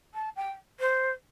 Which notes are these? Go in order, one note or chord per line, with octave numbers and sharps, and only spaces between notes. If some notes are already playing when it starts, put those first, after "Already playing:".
A5
G5
C5